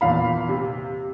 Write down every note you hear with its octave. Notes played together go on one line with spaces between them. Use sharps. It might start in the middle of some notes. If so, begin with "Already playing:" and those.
E2 A#2 F5 B5
C3